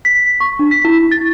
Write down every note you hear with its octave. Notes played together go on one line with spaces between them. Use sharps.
B6
C#6
D4
B6
E4
A6